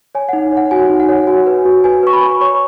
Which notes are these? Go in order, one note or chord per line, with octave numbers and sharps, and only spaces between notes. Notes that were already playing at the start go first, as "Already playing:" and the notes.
C#5 G#5
D#4 F#5
C#5 F#5
F#4 G#5
D#4
F#5
C#5
F#4 G#5
B4
F#4
B4 G#5
B4 C#6
B5
B4
C#5 C#6